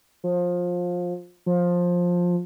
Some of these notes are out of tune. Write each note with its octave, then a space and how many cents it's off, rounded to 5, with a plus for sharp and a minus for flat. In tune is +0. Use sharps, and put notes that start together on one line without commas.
F3 +20
F3 +15